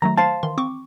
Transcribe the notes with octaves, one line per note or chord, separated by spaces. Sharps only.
D#3 F#3 A3 A#5
C5 F5 A5
D#3 E3 C6
C4 C#6 D6